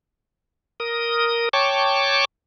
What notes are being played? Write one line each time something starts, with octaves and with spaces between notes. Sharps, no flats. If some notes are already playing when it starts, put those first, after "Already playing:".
A#4 D#6
C#5 G5 A5 C#6 D6